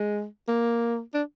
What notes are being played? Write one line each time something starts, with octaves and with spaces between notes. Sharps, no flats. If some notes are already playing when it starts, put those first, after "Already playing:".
Already playing: G#3
A#3
D4